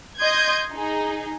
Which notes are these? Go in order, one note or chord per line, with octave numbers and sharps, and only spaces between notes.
D#5 C6 G6 G#6
D#4 G#4